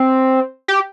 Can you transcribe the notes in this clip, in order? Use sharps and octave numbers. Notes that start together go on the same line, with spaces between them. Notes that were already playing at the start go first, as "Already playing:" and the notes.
Already playing: C4
G4